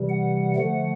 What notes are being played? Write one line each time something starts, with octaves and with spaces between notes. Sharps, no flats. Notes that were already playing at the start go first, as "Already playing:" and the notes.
Already playing: C3 E3 G3
F#5
D3 F3 A3 F#5